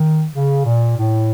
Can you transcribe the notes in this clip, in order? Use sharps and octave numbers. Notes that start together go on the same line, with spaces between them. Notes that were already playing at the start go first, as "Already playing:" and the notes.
Already playing: D#3
C#3
A#2
A2